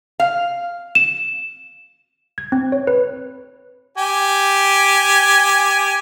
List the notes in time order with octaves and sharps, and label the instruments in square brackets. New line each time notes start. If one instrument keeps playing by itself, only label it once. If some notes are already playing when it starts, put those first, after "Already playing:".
[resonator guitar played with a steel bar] F5
[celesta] E7
[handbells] G#6
C4
C#5
B4
[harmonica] G4 G#5